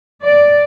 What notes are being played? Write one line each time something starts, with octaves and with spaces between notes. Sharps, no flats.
D5